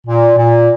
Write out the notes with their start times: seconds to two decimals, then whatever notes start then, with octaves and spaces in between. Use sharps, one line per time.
0.07 A#2
0.38 A#2